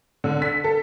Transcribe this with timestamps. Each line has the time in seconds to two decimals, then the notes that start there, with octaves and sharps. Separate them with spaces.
0.24 D3
0.42 B6
0.64 A4